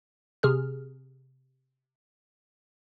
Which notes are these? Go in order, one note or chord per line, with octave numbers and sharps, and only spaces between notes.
C3 G#4 F6